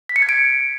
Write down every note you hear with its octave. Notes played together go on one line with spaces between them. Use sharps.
B6
C#7
G#6
D7